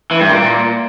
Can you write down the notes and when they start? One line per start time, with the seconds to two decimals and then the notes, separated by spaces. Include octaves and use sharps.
0.11 E3
0.21 G2
0.31 A#2